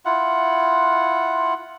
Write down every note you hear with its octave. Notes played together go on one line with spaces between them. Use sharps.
E4 F4 F#5